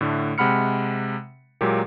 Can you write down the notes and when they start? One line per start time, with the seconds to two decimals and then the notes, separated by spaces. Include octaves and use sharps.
0.01 A2 D3 A3
0.38 C3 G#3 F#5 B5 F6 C#7
1.61 A#2 F#3 G#3 A#3 G4